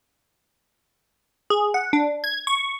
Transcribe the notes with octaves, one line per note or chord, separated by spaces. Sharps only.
G#4
F#5
D4
G#6
C#6